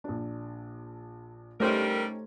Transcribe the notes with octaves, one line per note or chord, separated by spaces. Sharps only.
A#1 D4
G3 A3 C#4 D#4 G4 A#4 C5